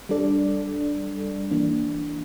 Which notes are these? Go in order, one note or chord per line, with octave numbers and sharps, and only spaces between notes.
G3 D4 A4 D5
E3 A#3 D4